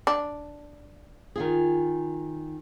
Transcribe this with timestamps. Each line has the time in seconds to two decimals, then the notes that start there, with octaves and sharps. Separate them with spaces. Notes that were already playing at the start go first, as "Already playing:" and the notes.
0.07 D4
1.36 D#3 F4 G#4